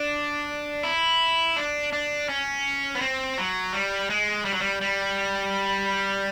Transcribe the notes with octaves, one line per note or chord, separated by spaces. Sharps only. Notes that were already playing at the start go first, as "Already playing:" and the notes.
Already playing: D4
E4
D4
D4
C#4
B3
C4
F#3
G3
G#3
G3
F#3
G3
G3